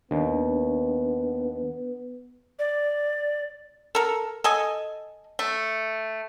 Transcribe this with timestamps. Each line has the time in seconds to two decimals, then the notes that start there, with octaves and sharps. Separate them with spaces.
0.11 D#2 B3 D4
2.59 D5
3.95 A4 A#4
4.44 A4 D#5 G#5
5.39 A3